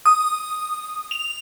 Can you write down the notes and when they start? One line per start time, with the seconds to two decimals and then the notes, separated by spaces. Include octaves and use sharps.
0.06 D#6
1.11 F7